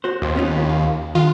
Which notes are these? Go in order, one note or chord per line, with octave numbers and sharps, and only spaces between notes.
F#4 C5
D#2
B3 C#4 F4
F5
D3 D#3 F4